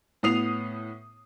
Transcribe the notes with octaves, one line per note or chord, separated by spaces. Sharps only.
A2 B3 D#6 C7 F7